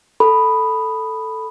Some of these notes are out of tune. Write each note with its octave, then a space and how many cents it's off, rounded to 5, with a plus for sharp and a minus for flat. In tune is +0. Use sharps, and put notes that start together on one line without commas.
A4 +0 B5 +0